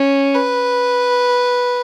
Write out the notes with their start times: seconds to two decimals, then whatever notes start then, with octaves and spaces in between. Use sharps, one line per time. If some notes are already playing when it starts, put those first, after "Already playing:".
Already playing: C#4
0.34 B4